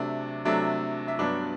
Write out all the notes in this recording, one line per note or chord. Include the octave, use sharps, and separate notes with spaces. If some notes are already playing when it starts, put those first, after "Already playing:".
Already playing: C3 F#3 A3 D4
C3 F#3 A3 D4
E5
G2 F#3 B3 D4 D5